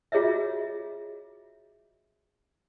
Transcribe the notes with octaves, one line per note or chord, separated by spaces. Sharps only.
F4 F#4 G#4 C#5 D#5 E5